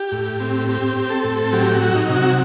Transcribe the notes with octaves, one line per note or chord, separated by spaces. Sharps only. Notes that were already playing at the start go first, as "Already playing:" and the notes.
Already playing: G4
A2
C4
C4 G4
C4
A4
A2
F#3 G4
F#4
F#3
D#4
C3
F#4